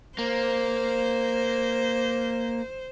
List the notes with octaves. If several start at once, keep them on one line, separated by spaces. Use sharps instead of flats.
A#3 C5